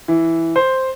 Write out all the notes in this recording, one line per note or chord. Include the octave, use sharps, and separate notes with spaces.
E3
C5